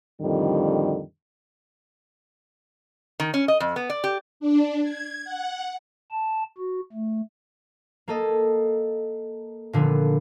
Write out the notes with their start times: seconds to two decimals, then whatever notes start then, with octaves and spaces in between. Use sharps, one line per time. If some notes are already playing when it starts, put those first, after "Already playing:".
0.21 F2 A2 D3 D#3 G3
3.20 D#3
3.34 C#4
3.48 D#5
3.60 F2
3.76 B3
3.90 D5
4.04 G4
4.40 D4
4.83 G#6
5.24 F#5
6.11 A5
6.58 F#4
6.93 A3
8.08 A#3 A4 D#5
9.73 A#2 D3 F3 B3